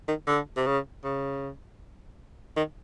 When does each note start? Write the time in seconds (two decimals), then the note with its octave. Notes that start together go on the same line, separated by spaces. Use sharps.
0.08 D#3
0.27 D3
0.56 C3
0.66 C#3
1.04 C#3
2.56 D#3